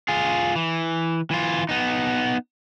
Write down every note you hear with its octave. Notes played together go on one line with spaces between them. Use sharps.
F4 G#4
E3
E3 F4
B3 D#4